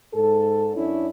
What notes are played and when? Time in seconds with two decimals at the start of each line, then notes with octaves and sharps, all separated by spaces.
0.14 G#2 A4
0.75 F#2 C#4 D4 E4 C#5